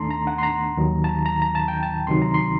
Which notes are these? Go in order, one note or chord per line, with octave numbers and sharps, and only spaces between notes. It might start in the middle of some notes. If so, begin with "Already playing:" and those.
Already playing: D#2 D#3 A3 D4 A5 A#5 C6
A#5
F#5
C6
A#5
D#2 D#3 F#3
A5
A#5
A#5
A#5
A5
G5
A5
D2 C3 D#3 F#3 C6
A#5
C6